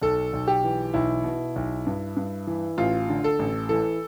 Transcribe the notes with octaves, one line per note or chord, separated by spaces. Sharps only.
B1 A4
B1
G4
E3
B1 E4
B2
B1
G2
G2
E3
A1 F4
D3
A4
A1
E3 A4